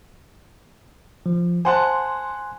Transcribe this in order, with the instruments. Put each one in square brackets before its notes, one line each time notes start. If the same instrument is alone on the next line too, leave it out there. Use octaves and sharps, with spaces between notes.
[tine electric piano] F3
[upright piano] C5 F#5 A5 [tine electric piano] G#5 C6 F#6